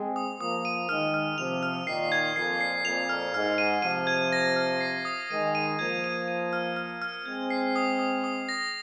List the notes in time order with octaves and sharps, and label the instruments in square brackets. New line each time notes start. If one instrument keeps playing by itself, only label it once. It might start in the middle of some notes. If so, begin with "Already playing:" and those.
Already playing: [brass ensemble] G#3 C4
[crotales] D#6
[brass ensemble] F3 A#3 [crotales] D#6
[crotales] D#7
[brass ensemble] D#3 G#3 [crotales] F6
[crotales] F6
[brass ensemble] C3 F3 [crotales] F7
[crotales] F6
[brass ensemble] A#2 D#3 [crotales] C7
[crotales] G#6
[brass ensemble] F2 A#2 [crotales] C7
[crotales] C7
[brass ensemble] F2 A#2 [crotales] F7
[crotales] F6
[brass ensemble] G#2 [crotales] F6
[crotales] D#7
[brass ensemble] C3 F3 [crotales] D#7
[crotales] G#6
A#6
F6
C7
D#6
[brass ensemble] D#3 G#3 [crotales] D#7
[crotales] D#7
[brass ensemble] F3 A#3 [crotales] G#6
[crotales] D#7
D#7
F6
F6
F6
[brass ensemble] G#3 C4 [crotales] G#6
[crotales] C7
D#6
D#6
D#6
A#6